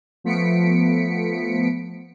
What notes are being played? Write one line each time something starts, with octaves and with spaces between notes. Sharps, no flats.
F3 A3 B3 B6 C#7 D7